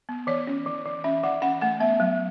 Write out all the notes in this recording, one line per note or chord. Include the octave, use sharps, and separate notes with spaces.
B3
E3 C#5
C#4
E3
E3
C#4 E5
E3 F#5
C#4 F#5
A3 F#5
B3 E5
F#3